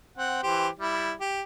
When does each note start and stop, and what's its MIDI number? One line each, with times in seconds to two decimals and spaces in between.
0.18 0.38 60
0.18 0.38 78
0.43 0.68 52
0.43 0.68 67
0.43 0.68 72
0.79 1.12 55
0.79 1.12 64
1.20 1.42 67